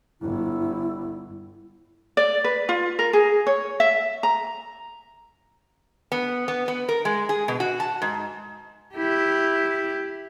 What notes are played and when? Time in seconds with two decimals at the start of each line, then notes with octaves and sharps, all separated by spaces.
0.22 G1 E4
2.17 D5
2.44 B4
2.69 F4
2.99 A#4
3.13 G#4
3.47 C#5
3.80 E5
4.23 A#5
6.12 B3
6.48 B3
6.68 B3
6.89 A#4
7.05 G#3
7.29 G#4
7.48 B2
7.60 F#4
7.80 A5
8.02 G#2
8.95 E4 G4